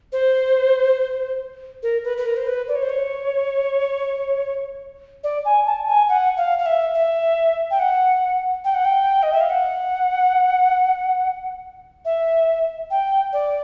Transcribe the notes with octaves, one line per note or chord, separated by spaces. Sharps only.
C5
A#4
B4
B4
A#4
C5
B4
D5
C#5
C5
C#5
D5
G#5
A5
G#5
F#5
F5
F5
E5
E5
G5
F#5
G5
F#5
G5
D#5
E5
F5
F#5
E5
G5
D5